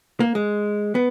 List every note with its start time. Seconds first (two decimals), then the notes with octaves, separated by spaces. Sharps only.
0.20 A#3
0.35 G#3
0.95 B3